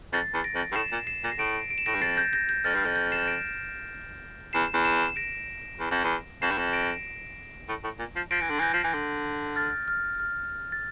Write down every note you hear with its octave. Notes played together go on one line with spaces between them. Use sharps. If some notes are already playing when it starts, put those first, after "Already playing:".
F2 A6 C7
E2
A#6 D7
F2
G2
A2 C7 E7
A#2
C7 E7
A#2 A#6
C7
A2 A#6 D7
D7
E7
A2 A#6 D7
G2
F2 A6 C7
G6 A#6
G6 A#6
G6
F2 F6 A6
G2
F2 G6
G6
C7 E7
A#6 D7
E2 C7 E7
E2
C7 E7
A#6 D7
E2
F2
E2
F2 C7 E7
G2
F2
A#6 D7
A2
A2
A#2
F3
F3 A#6 D7
E3
D3
E3 G6 A#6
F3
E3
D3
F6 A6
F6
F6
A6